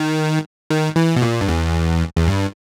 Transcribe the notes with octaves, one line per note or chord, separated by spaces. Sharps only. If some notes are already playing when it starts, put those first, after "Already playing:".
Already playing: D#3
D#3
E3
B2
A#2
G2
E2
E2
G2